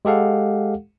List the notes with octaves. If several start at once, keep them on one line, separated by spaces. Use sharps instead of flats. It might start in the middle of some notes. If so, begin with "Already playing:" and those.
G#3 G4 A4 F5 F#5